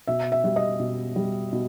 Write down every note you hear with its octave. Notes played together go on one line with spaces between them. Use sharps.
B2 E5
E5
G3
D#5
B2
G3
B2